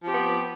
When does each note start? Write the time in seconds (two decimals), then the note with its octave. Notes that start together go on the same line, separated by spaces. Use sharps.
0.01 F3
0.05 C4
0.08 G4
0.12 B3